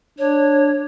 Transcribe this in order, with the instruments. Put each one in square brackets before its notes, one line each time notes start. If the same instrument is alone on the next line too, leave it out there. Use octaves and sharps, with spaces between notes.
[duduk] D4 [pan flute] C#5